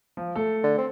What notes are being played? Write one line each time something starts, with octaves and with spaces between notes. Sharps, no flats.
F3
A3 A4
D3
C4